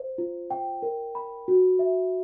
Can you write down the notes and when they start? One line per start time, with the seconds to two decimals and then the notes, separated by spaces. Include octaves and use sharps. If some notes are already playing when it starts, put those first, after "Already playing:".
Already playing: C5
0.18 F4
0.51 G5
0.82 A#4
1.15 B5
1.48 F#4
1.79 E5